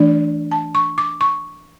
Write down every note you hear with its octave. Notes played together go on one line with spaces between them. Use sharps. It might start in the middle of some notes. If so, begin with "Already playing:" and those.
Already playing: E3 A3 D4 D5
A5
C#6
D6
C#6